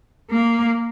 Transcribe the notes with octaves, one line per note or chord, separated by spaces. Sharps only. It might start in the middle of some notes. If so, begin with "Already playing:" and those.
A#3